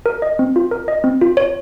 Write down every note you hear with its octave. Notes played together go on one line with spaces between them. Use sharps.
A#4
D#5
C4
F4
A#4
D#5
C4
F4
C#5